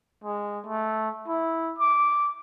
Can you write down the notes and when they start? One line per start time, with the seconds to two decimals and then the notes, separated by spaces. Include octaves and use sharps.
0.24 G#3
0.66 A3
1.28 E4
1.79 D6